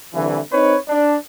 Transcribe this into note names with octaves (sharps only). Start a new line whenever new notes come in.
C2 D3 E3
C4 D#4 B4 C#5
D4